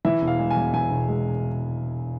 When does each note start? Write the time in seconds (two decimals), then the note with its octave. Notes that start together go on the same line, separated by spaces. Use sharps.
0.05 E3 E5
0.22 E1
0.27 F5
0.39 G#3
0.50 G#5
0.56 E2
0.73 E3 G#5
0.91 E1
1.08 G#3